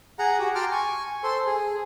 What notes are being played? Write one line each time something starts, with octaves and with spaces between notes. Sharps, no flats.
G#4 F#5 A#5
F#4 G4
G5 A5 A#5 C6 D6 F6
G#5 C#6
A4 C5 C6
G#4